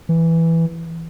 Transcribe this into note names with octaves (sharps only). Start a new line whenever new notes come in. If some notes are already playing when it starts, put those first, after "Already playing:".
E3